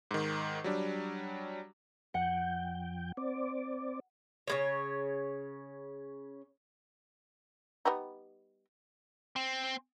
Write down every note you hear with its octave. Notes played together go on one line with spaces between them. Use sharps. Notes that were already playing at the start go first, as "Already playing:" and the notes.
G#2 D#3
F#3 G3 D4
F2 F#5 G5
C4 D5
C#3 G#3 C#5
G3 B3 D#4
C4